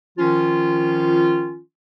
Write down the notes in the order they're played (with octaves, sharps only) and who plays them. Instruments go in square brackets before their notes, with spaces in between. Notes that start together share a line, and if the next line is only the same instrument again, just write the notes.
[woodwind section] D#3 F3 C#4 F4